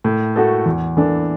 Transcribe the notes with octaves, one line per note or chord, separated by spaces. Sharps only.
A2
A3 F#4 A4
E2
E3 D4 A4